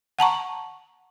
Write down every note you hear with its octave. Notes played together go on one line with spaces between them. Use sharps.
F#5 A5 A#5 C#6